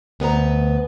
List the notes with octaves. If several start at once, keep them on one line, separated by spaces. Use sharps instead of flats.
D2 B3 B4 A#5